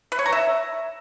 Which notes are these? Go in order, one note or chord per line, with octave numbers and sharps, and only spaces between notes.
B4
C#5
A#5
E5